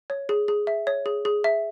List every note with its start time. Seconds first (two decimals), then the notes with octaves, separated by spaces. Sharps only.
0.10 C#5
0.29 G#4
0.48 G#4
0.67 E5
0.87 C#5
1.06 G#4
1.25 G#4
1.44 E5